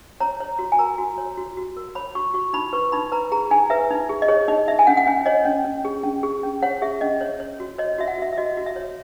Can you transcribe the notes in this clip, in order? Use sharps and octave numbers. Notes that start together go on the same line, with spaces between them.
C#5 A#5
C#5
F#4
G#5
A#4 A#5
F#4
C#5
F#4
F#4
A#4
C#5 B5
F#4 C#6
F#4 C#6
D#4 B5
B4 C#6
D#4 B5
B4 A#5
G#4 A#5
D#4 G#5
B4 E5
D#4
G#4
D#5
G#4 C#5
D#4 D#5
D#4 E5
G#5
C#4 F#5
F#5
C#4 G#5
C#5 D#5
C#4
C#4
G#4
C#4
G#4
C#4
C#5 F#5
G#4 E5
C#4 D#5
C#5
C#5
F#4
C#5 D#5
F#4 E5
F#5
F#4 E5
E5
F#4 D#5
F#4
E5
C#5